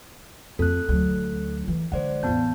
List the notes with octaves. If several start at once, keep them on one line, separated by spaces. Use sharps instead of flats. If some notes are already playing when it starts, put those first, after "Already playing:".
F2 A#3 A4 F#6
D2 F#3
E3
D3 G#3 C5 D5 F#5
A1 E2 B3 A5 G6